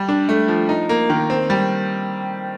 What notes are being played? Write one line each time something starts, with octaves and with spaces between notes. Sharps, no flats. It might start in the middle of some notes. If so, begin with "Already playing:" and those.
Already playing: G3
D4
A3
F3
D#4
A#3
D#3
C4
G3